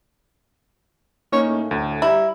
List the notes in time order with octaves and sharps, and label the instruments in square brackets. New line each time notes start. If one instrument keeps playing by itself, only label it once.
[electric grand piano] A#3 C#4 D#4 [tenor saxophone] C#5
[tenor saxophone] A2
[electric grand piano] D2
[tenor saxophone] G3 [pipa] E4 [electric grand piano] A#5